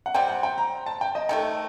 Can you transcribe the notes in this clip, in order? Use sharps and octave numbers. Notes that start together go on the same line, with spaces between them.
F#5
C3 G3 C4 G5
F#5
G5
A#5
A5
G5
D#5
C3 D#3 A3 G5